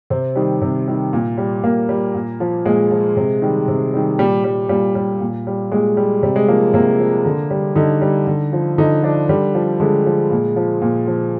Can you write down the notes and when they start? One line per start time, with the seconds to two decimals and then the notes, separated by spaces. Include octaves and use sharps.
0.10 C3 C4
0.35 D#3 G3
0.61 C3
0.87 D#3 G3
1.13 A#2
1.38 G3
1.63 A#2 A#3
1.89 G3
2.14 A#2
2.40 F3
2.65 A#2 G#3
2.91 F3
3.16 C3
3.42 D#3 G3
3.68 C3
3.94 D#3 G3
4.19 A#2 G3
4.44 G3
4.69 A#2 G3
4.95 G3
5.21 A#2
5.47 G3
5.72 A#2 G#3
5.97 G3
6.23 C3 G3
6.36 G#3
6.48 F3 A#3
6.74 C3 A#3
6.99 F3
7.25 D3
7.51 G3
7.76 D3 D#4
8.02 G3
8.27 D3
8.53 F3
8.78 D3 D#4
9.03 F3 D4
9.29 D3 G3
9.54 F3
9.80 D3 G#3
10.06 F3
10.31 A#2
10.56 F3
10.82 A#2
11.07 F3